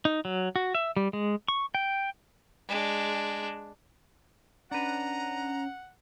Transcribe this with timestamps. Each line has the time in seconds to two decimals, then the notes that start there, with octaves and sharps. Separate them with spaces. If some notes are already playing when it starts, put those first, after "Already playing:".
0.05 D#4
0.25 F#3
0.56 F#4
0.75 E5
0.96 G3
1.13 G#3
1.48 C#6
1.75 G5
2.68 G#3 D4
4.71 C#4 D4 B4 F#5 A#5